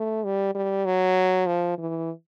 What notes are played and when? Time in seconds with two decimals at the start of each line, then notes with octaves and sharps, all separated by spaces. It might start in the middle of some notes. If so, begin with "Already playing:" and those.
Already playing: A3
0.24 G3
0.55 G3
0.86 F#3
1.47 F3
1.78 E3